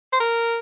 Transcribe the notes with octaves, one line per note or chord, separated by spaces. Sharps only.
C5
A#4